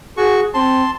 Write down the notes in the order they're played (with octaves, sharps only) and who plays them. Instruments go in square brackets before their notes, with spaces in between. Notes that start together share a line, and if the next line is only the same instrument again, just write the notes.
[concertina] F#4 C#6 [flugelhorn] G#4
[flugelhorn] C4 [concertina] A5 C6